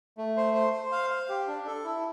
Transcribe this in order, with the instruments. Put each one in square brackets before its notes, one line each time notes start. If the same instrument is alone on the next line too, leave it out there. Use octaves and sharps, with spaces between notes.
[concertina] A3
C5
C5
C5
F5
F5
G4
D4
A4
E4